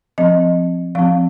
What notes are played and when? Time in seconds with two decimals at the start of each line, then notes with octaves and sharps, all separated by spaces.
0.18 F3 C4 D#5
0.95 F3 C4 F5